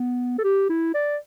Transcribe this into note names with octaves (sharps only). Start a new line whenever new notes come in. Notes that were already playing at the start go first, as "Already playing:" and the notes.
Already playing: B3
A4
G4
E4
D5